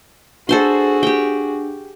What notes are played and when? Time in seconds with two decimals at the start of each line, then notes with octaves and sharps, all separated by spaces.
0.49 D4 F#4 G#4 A4 C5 C6
1.03 G4 G5